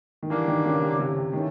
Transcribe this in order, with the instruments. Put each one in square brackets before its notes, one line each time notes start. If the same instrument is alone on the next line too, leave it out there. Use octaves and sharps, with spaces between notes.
[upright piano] D#3
[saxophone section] D3 G3 A#3 D4 [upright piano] E3
[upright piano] D#3
C#3
C3
C3
C3
[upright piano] D#3 [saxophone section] E3 A3 C#4